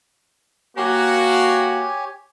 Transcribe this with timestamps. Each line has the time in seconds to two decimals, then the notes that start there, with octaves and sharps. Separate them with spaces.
0.77 A#3 F#4 G4 C#5 G#5